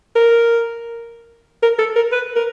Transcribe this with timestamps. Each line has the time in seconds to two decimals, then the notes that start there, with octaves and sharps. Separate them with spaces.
0.16 A#4
1.63 A#4
1.79 A4
1.96 A#4
2.12 B4
2.36 A#4